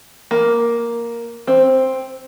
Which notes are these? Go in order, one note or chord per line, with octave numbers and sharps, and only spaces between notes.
A#3
C4